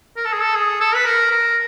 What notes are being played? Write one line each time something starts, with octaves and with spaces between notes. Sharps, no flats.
A#4
A4
G#4
A4
G#4
A4
B4
A#4
A#4